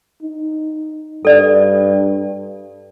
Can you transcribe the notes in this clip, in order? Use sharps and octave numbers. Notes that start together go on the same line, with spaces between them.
D#4
G2 A4 D5